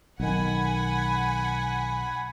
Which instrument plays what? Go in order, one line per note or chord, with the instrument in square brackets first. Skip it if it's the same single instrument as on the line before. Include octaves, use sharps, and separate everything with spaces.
[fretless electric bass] B1 D#3 [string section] F#5 G#5 B5